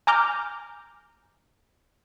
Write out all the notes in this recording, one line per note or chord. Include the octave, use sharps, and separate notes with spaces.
G#5 A#5 D6 F6 G6